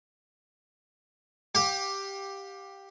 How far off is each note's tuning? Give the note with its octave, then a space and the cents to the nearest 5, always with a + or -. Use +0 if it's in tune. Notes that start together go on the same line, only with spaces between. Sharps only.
G4 +0 F5 +35